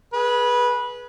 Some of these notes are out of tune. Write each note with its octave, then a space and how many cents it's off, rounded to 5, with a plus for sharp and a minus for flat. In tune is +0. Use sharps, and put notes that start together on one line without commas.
G#4 +15 B4 -20